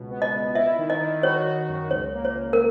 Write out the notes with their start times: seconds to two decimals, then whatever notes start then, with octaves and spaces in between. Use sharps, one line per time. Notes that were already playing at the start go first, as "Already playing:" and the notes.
Already playing: C#2 B2
0.10 B3
0.22 D#5
0.32 C#2
0.55 E4 E5
0.78 D#3
0.90 D#5
1.01 D#3
1.23 F#4 C#5
1.46 F#4
1.69 F#2
1.91 C#2 C#5
2.14 A#3
2.25 C#5
2.36 C#2
2.53 A#4